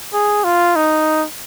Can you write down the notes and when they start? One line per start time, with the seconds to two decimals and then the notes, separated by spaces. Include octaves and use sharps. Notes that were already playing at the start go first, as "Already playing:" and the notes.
0.13 G#4
0.44 F4
0.76 D#4